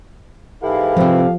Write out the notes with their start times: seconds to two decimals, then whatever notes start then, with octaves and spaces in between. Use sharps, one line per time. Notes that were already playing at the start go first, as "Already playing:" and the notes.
0.63 G#2 E3 E4 G4 A4 F5
0.97 C3 F3 C4